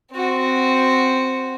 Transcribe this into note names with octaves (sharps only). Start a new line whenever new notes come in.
C4 F#4